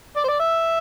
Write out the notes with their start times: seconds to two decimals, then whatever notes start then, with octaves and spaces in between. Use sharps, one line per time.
0.17 D5
0.24 C5
0.28 D5
0.39 E5